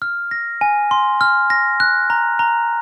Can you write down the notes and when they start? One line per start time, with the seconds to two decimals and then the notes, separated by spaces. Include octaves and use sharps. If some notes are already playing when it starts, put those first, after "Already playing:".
0.02 F6
0.31 A#6
0.61 G#5
0.91 C6
1.21 F6
1.50 A#6
1.80 F#6
2.10 A#5
2.39 A#5